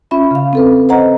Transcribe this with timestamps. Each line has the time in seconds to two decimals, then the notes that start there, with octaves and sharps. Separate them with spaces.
0.11 C#4 F4 E5 B5
0.31 C#3 F5
0.53 C4 A4 B4
0.89 C5 D#5 F#5 A#5